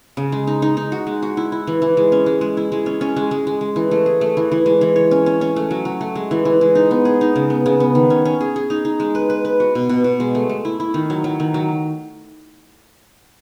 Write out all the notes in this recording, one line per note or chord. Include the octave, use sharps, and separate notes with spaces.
C#3
G#3
D#4
D#4
D#4
F#4
G#3
F#4
E4
E4
E3
E3
G#3
C#4
G#3
G#3
E4
G#3
C#4
C#4
G#3
G#3
G#3
G#3
E3
A3
G#4
A3
E3
E3
G#3
E3
C#5
C#4
C#4
C#4
A3
F#3
F#3
A3
G#3
E3
E3
G#3
D#4
B3
G#4
D#4
C#3
B3
C#3
B3
D#3
C#4
C#4
G#4
G#4
D#4
D#4
G#3
B4
B4
B4
F#4
B2
B2
B2
G#3
A3
A3
E4
E4
D#3
F#3
F#3
D#3
F#3